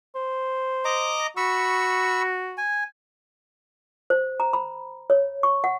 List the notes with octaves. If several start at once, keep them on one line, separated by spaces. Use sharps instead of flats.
C5
D#5 A#5 D6
F#4 B5 C#6 E6
G#5
C5
A#5
B5
C#5
C#6
F#5